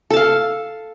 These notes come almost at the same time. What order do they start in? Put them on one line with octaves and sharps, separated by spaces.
A4 A5 F5